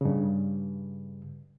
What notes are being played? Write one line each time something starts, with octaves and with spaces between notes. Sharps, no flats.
G2 C#3